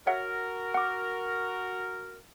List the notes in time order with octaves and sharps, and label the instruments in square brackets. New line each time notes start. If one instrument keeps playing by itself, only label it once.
[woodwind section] F#4 A#4 [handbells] C#5 E5 F#5
[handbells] F#5 D6